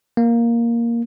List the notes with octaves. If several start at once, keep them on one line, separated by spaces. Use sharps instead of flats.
A#3